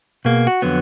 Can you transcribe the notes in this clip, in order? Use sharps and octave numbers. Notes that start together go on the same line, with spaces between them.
B2 A#3 G#4
F#4
F2 D3 F#3 B3